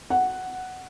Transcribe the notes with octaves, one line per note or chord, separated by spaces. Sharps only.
F#5